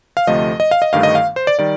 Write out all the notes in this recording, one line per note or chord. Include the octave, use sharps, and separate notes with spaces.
F5
D2 C3 F3 A3 D#5
D#5
F5
D#5
G1 G2 D#3 A3 F5
D#5
F5
C5
D5
D#3 G3 D5